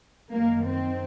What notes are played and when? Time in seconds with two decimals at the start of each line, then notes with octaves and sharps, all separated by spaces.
0.29 F#2 D#3 A#3
0.63 C4